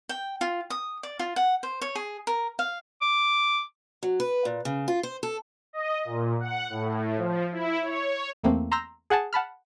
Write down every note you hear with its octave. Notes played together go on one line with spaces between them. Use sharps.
G5
F4
D#6
D5
F4
F#5
C5
C#5
G#4
A#4
F5
D6
F#3
B4
A#2
C#3
F4
C5
A4
D#5
A#2
F#5
A2
F3
E4
C#5
E2 A3 A#3 C4
A#5 C6 E6 G6 A#6
G#4 F#5 G#5 A5
F#5 A5 B5 F6